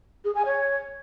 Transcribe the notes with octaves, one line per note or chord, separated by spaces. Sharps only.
G#4
G#5
C#5